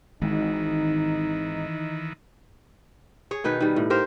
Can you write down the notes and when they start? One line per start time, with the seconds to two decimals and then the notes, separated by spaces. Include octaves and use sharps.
0.22 G#1 G#2 D#3 E3 D#4
3.31 G#4 C#5
3.44 B2 D#3 D#4 B4
3.61 D#3 G3
3.76 A2
3.90 G4 A#4 C5 F5